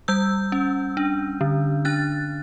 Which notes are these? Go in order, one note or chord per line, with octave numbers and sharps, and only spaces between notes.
G3 E6 G6
C#4
D4
D3
D4 F#6 A6